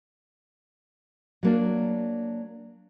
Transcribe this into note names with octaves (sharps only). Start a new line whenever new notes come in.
F#3 A#3 D4